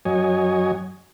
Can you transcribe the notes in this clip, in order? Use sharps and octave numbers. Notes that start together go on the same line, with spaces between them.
F#2 F#3 C#5 D#5 G#5